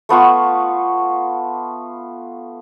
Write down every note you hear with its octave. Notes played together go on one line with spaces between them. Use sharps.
A3 B3 F4 C#6